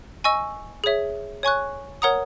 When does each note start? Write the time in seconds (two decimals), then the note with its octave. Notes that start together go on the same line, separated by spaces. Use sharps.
0.24 D#5 G#5 C#6 E6
0.84 G#4 C#5 E5
1.43 C#5 G#5 C#6 F#6
2.02 A#4 C#5 F#5 A#5 D#6